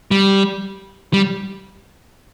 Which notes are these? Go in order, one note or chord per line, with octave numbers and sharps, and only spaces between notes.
G3
G3